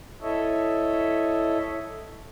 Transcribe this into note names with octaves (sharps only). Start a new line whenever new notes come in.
E4 A4 C#5 D#5 E5